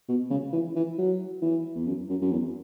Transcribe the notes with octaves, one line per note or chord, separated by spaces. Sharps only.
B2
C#3
E3
E3
F#3
E3
E2
F#2
F#2
F#2
E2